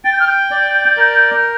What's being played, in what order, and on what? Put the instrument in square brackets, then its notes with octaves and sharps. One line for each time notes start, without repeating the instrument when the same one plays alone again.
[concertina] G5 [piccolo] A6
[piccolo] G6
F6
G6
[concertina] D5
A#4